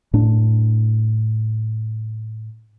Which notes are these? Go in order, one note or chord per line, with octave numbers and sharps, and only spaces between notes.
A2 D4